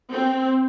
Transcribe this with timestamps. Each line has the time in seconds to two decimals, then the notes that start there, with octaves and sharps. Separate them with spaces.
0.11 C4